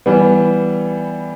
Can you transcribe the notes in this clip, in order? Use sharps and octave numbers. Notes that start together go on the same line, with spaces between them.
E3 G3 B3